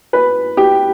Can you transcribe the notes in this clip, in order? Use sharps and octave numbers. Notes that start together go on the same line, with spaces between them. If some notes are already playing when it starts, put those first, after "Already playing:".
B4
G4